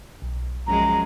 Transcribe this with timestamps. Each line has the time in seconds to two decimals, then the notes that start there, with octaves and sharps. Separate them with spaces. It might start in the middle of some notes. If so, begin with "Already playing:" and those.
0.22 B1
0.67 F#2 F3 G#3 A#5